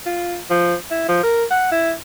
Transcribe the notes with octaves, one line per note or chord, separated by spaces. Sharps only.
F4
F3
E4
F3
A#4
F#5
E4